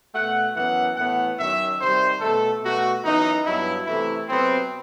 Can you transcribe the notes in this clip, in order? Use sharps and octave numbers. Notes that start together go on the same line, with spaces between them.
B2 A3 F#5
F#2 E3 B3 F#5
A2 E3 B3 F#5
F#2 D#3 F#3 E5
C3 D#3 G3 C5
B2 A3 A4
B2 A3 F#4
F#2 E3 B3 D#4
G2 F#3 B3 E4
C3 E3 A3 E4
C3 F#3 B3 C4